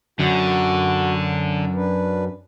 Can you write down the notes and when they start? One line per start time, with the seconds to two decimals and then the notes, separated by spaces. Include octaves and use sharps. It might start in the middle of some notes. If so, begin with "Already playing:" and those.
0.20 F#2 D3 F#4
1.75 D4 B4